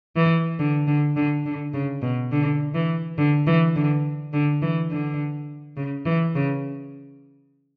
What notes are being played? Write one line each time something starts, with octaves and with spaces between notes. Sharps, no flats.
E3
D3
D3
D3
D3
C#3
B2
D3
E3
D3
E3
D3
D3
E3
D3
C#3
E3
C#3